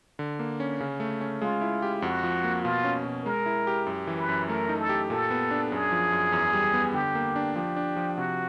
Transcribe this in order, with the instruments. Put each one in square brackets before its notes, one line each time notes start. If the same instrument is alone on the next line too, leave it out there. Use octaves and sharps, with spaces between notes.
[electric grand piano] D3
A#3
C#4
C#3
A3
C#4
[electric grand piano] G#3 [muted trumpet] F4
[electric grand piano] E4
G4
[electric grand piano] F2 [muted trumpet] F#4
[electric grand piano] F3
A#3
[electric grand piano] B2 [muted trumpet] F4
[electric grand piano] C#4
B2
[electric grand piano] G#3 [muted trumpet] A#4
[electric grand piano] E4
G4
F#2
E3
[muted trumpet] B4
[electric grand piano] F#2
[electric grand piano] A3 [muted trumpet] A#4
[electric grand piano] D#4
[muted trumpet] A4
[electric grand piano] G4
[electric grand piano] A#2 [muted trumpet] A4
[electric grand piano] B3
D4
[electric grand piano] F#2 [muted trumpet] G#4
[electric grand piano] F3
F#2
E2
G3
B3
[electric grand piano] D3 [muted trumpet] G4
[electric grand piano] A#3
D4
[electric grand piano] F3 [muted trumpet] G4
[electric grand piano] D4
F3
[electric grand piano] C3 [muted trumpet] F#4